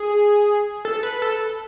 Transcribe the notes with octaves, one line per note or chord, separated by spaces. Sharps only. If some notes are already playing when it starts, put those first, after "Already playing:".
Already playing: G#4
A4
B4
A4